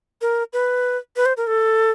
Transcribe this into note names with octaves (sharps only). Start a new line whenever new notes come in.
A#4
B4
B4
C5
A#4
A4